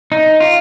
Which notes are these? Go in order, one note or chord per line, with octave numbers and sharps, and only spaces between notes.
D#4
F4